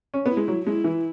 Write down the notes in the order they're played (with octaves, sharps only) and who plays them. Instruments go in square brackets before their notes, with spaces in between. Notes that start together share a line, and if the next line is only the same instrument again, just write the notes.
[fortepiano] C#4
[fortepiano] B3 [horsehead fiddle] E4
[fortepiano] G#3
F#3
[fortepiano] G#3 [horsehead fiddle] E4
[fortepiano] E3